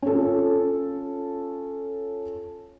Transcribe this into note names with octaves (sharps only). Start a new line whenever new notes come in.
C#4 F4 A4